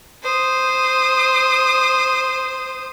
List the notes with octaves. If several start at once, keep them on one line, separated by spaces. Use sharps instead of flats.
C5 D#6